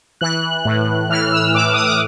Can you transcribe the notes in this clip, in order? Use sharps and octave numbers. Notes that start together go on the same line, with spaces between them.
E3 F#6
A2
E3 F6
E6
A2 D6
D#6
D6